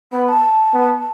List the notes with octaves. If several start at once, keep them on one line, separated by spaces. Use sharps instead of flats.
B3 B5
A5
B3